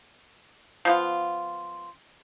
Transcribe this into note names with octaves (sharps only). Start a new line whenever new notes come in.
F3 B3 F4